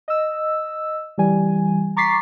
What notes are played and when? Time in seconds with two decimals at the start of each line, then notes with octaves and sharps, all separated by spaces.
0.08 D#5 E6
1.18 E3 G3 G#5
1.97 A#5 C#6 D6 A6 B6 C7